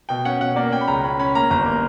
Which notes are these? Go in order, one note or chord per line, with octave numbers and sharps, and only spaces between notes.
B2 G5
C#4 F#5
B2 F#5
A#3 D5
C#4 G5
B5
C#2 A#5
C#4 B5
C#4 B5
A#3 A#5
G1 A#5
A#3